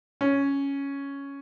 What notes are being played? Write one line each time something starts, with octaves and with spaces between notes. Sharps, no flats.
C#4